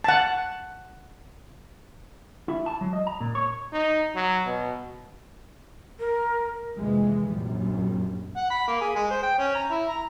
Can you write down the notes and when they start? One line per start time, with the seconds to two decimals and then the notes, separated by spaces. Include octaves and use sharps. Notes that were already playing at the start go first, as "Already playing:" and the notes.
0.04 F#5 A5
2.48 E4
2.66 A5
2.81 F#3
2.93 D#5
3.07 A#5
3.21 A#2
3.35 C#5
3.73 D#4
4.16 F#3
4.45 B2
6.00 A#4
6.77 F1 D#2 E3 G#3
7.29 A#1 F#2 G3
8.36 F#5
8.51 B5
8.68 A#3
8.81 G#4
8.95 G#3
9.10 C5
9.23 G5
9.39 C#4
9.55 A#5
9.71 E4
9.88 A#5